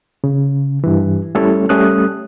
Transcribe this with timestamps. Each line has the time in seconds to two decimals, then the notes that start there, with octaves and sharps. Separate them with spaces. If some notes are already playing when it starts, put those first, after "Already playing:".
0.24 C#3
0.84 G2 E3
1.35 G3 A3 C#4 E4 A4 C#5
1.69 G3 A3 C#4 D#6 F#6